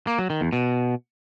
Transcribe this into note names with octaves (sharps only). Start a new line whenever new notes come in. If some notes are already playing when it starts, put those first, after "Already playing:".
A#3
F#3
D#3
E2
B2